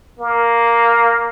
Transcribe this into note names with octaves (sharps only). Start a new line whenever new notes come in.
A#3